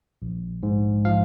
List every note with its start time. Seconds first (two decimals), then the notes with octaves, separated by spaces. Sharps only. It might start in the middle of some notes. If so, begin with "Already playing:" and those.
0.22 A#1
0.63 G#2
1.05 F3 F5